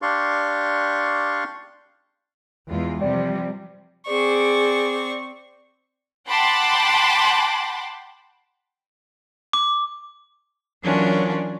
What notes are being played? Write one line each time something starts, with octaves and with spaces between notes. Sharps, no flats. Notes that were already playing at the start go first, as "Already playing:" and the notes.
D4 G4 D5 F5 C6 C#6
E2 E3 G#3 F4
C3 E3 F3 G3 D5
C4 G#4 D5 C#6
F#5 G5 A5 B5 C6 D6
D6
E3 F#3 C#4 D4 F4 A#4